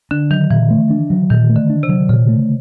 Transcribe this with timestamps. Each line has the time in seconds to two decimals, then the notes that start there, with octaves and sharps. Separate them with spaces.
0.11 D3 D4
0.31 D#3 F#3
0.50 A#2 E3
0.70 A3
0.90 D4
1.10 F#3
1.30 A#2 D#3
1.49 A3
1.56 D3
1.70 D4
1.83 C3
1.89 F#3
2.09 A#2 C#3
2.28 A3